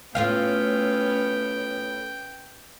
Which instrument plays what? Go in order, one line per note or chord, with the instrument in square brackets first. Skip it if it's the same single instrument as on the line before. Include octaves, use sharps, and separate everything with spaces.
[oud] A2 F4 F5 [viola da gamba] B3 C#4 [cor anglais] G5